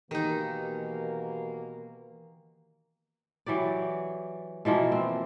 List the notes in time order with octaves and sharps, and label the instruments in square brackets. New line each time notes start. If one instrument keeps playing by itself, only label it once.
[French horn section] B2 A#3 [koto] D#3 D#4 [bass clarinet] E3 [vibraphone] G4
[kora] E3 F#3 G4 D5
B2 E3 F3 A#3
C4